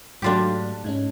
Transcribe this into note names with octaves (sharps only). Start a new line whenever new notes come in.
G#2 F#3 A3 D4 F4 G4
G#2 G#3 C#4